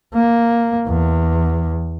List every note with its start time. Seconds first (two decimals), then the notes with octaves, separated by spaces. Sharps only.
0.14 A#3
0.88 E2